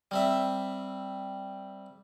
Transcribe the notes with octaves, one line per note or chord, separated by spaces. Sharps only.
G3 C4 E5